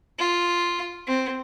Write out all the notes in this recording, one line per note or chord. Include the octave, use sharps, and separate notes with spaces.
F4
C4